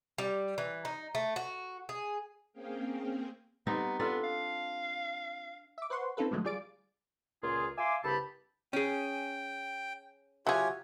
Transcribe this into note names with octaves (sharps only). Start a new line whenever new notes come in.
G3
E3
D#4
A3
F#4
G#4
A#3 C4 C#4 G#4 F5 G5
G3 B3 C4 D#4
B3 D4 F4 A4
F5
E5 D6
B4 C5 F#5 C6 C#6
C4 C#4 D#4 F4 A4 B4
A2 D3 F3 F#3 G#3 A3
G3 F4 G#4 D5 A6 D7
C#2 A#2 F4 G#4
E5 F5 G#5 C6 D6
C2 G2 C#3 G4 A5 B5
C#4 G#4 G5
F#3 F4 G4 G#4 C#5 E5 F#5 G#5